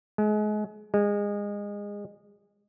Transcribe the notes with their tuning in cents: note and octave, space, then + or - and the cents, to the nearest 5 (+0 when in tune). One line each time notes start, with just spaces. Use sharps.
G#3 +30
G#3 -25